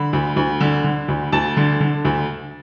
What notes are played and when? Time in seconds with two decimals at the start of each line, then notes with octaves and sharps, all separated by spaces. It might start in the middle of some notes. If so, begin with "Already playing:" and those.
Already playing: D3 B5
0.13 D2
0.36 D2
0.61 D3
0.84 D3
1.08 D2
1.32 D2 A5
1.57 D3
1.80 D3
2.05 D2